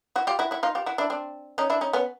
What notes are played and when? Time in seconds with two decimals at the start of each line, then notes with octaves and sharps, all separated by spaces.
0.16 E4 F#4
0.27 F4 G4
0.39 E4 F#4
0.51 E4 F#4
0.63 D#4 F4
0.75 F4 G4
0.86 E4 F#4
0.98 D4 E4
1.10 C4 D4
1.58 C#4 D#4
1.70 D4 E4
1.81 C#4 D#4
1.93 B3 C#4